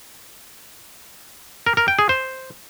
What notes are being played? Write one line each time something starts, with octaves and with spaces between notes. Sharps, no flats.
A#4
A#4
G5
G#4
C5